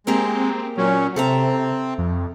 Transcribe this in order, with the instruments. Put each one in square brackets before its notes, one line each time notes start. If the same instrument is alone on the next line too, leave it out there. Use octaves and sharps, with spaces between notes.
[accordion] G#3 [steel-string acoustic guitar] A#3 G4 A#4 [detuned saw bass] C4
[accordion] A#2 C#4 [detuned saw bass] F#3
[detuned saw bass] C3 [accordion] C4 [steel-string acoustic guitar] A4 E5 A#5
[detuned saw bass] F2